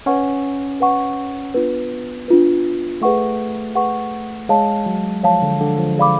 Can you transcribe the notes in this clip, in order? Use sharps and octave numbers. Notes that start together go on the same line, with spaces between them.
C#4 B4 F#5 C#6
B4 F#5 C#6
B3 D4 F4 B4
D4 F4 B4
A3 G#4 B4 F#5 C#6
G#4 B4 F#5 C#6
G#3 C#5 F5 A5
F#3
F3 C#5 F5 A5
D3
D3
F3
G#4 D5 F5 B5 D6